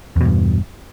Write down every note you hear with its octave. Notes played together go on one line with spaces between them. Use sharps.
E2 G2 B2